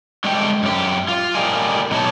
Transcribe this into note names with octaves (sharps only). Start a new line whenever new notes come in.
D3 G#3 A3 C4 G4 G5
F#2 G4
F4
A2 G4 A#4 D5 D#5 G#5
B2 F#3 A3 D#4 C#5 A5